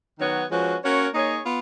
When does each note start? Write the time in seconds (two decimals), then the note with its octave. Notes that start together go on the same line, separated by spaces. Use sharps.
0.19 D#3 F#3 B3 F#4 C#5
0.50 F3 G#3 C#4 F#4 B4
0.82 A#3 C#4 F#4 A#4 C#5
1.14 A#3 D#4 G#4 C#5
1.46 B3 F4